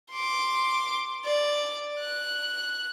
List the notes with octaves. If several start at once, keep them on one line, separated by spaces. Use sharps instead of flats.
C6 D6
D5
F#6